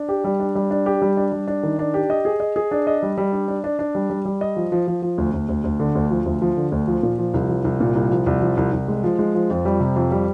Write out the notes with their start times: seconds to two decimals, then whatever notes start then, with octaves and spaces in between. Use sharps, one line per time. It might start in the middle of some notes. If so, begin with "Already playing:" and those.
Already playing: D4
0.09 G4
0.24 G3
0.40 D4
0.55 G3
0.71 D4
0.86 G4
1.02 G3
1.17 D4
1.32 G3
1.48 D4
1.63 D#3
1.79 D4
1.94 G4
2.10 D#5
2.25 G#4
2.40 D#5
2.56 G#4
2.71 D4
2.87 D#5
3.02 G3
3.18 G3
3.32 D4
3.48 D4
3.64 D4
3.79 D4
3.95 G3
4.10 G3
4.25 G3
4.41 D#5
4.56 F3
4.72 F3
4.87 F3
5.02 F3
5.18 D2
5.34 D2
5.49 D2
5.64 D2
5.80 D3
5.95 D2
6.11 F3
6.26 D2
6.42 F3
6.57 D3
6.72 D2
6.87 F3
7.03 A#2
7.18 F3
7.34 C2
7.49 F3
7.64 C2
7.80 A#2
7.95 C2
8.11 F3
8.26 C2
8.42 F3
8.57 C2
8.73 C2
8.88 G#3
9.04 F3
9.19 G#3
9.35 F3
9.50 F2
9.65 G3
9.80 C3
9.96 F2
10.11 G3